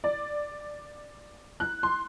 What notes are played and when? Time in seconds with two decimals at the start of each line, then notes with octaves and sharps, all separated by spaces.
0.04 D5
1.60 F#6
1.83 C6